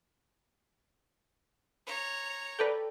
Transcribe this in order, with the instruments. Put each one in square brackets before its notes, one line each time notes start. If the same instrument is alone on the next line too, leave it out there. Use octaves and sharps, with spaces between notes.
[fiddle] C#5 A#5
[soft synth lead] A4 [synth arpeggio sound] B4 D5 G5